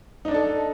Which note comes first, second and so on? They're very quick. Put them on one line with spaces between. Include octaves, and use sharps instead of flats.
D#4 D4 D5 A4